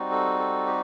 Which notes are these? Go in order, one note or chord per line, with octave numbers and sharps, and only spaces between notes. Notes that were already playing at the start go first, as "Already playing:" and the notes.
Already playing: G3 C4 D#4 F#4
A4
A4
G4